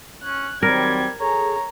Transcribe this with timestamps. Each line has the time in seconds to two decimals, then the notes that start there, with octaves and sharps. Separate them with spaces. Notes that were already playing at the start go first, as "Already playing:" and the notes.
0.24 C#4 F#6
0.63 D#3 F#3 G3 C4 A#4 G#6
1.20 G#4 A4 C#5 A#5